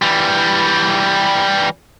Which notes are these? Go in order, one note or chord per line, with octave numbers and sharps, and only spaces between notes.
E3 G3